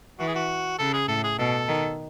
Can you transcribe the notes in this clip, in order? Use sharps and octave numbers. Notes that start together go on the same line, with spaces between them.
E3 F#4
G#4
F#4
C#3 A4
G#4
A2 A4
G#4
B2 A4
D#3